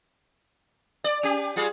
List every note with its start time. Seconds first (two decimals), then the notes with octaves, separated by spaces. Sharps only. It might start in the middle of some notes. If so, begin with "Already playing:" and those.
1.04 D5
1.23 C#4 G4
1.56 G3 F4 G#4